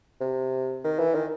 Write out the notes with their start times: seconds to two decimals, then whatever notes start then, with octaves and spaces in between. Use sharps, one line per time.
0.21 C3
0.84 D#3
0.99 E3
1.15 D#3